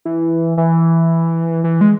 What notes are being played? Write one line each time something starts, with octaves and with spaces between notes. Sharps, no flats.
E3
E3
E3
G#3